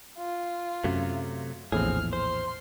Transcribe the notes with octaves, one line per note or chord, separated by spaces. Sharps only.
F4
F#2 C3 F#3 A3
A#1 E2 A2 C4 G#4 F6
C5 C6